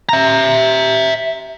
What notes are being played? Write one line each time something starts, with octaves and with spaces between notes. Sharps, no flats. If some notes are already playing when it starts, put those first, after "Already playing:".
E5 A#5